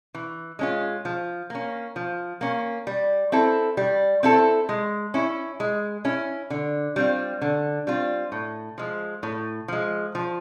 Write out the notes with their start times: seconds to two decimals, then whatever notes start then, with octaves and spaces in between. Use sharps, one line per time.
0.14 E3
0.59 G#3 C#4 F4
1.05 F3
1.50 A#3 C#4
1.96 F3
2.41 A#3 C#4
2.87 G3
3.32 C4 E4 A4
3.77 G3
4.23 C4 E4 A4
4.69 G#3
5.14 C#4 E4
5.60 G#3
6.05 C#4 E4
6.50 D3
6.96 G3 C4 F4
7.42 D3
7.87 G3 C4 F4
8.32 A2
8.78 F3 G#3
9.23 A2
9.68 F3 G#3
10.15 F3